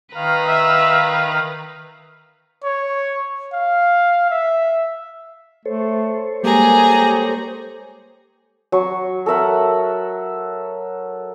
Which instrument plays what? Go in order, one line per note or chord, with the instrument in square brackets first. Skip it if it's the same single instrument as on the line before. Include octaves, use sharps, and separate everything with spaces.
[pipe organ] D#3 F5 [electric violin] B4 A#5
[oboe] E5
[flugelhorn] C#5
F5
E5
[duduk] A3 [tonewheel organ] A4 C5 C#5
[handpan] G3 G#3 A#3 [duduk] G4 [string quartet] G#4 A#5
[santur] F#3 C#6
A4 A#4 E5 F#5